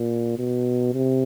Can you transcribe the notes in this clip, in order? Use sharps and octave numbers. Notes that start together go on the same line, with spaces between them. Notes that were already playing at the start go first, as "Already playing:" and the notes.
Already playing: A#2
B2
C3